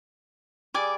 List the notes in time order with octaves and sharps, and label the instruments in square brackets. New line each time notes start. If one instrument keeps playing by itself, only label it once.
[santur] G3 G#4 [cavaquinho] D5 G#5 D6